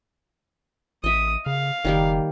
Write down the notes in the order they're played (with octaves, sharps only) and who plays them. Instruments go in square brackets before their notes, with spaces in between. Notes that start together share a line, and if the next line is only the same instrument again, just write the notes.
[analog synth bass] A1 [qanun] D#5 E5 [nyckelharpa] D#6
[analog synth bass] C#3 [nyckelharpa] F5
[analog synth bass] F#1 [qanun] D#3 G3 A#3